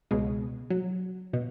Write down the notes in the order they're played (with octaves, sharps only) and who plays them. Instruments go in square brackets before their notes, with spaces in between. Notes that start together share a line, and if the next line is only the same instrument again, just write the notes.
[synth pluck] C#2 B2 G#3
F#3
B2